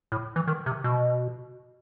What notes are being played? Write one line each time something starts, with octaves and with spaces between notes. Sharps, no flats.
A2
E3
D#3
C3
B2